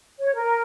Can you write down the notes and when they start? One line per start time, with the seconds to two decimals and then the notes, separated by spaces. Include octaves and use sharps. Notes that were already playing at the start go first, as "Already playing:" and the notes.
0.19 C#5
0.35 A#4